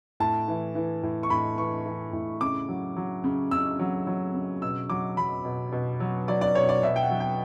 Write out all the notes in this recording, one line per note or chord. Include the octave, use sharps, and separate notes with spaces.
A2 A5
E3
E3
A2
C#6
A2 B5
E3 C#6
E3
A2
C#3 D6
F#3
F#3
C#3
C#3 E6
F#3
F#3
C#3
B2 E6
F#3 D6
F#3 B5
B2
B2
F#3
F#3 D5
D5
B2 C#5
D5
B2 E5
G5
F#5
F#3
G5